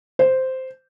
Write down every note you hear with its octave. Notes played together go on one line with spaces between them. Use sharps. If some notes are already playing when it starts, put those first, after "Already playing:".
C5